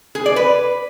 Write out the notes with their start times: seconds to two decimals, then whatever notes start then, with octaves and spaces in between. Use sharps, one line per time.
0.15 G#4
0.26 D5
0.36 B4